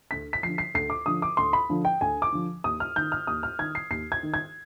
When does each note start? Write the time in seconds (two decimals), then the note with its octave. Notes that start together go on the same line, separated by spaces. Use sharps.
0.11 D2 B6
0.33 B6
0.43 D3 F3 C7
0.58 C7
0.75 D2 C7
0.90 D6
1.06 D3 F3 D#6
1.22 D6
1.37 D2 C6
1.53 B5
1.69 D3 F3
1.85 G5
2.01 D2 G#5
2.22 D6
2.32 D3 F3
2.64 D#2 D#6
2.80 F6
2.96 D#3 G6
3.12 F6
3.27 D#2 D#6
3.43 F6
3.59 D#3 G#6
3.75 C7
3.90 D#2 C7
4.12 G#6
4.23 D#3
4.34 G#6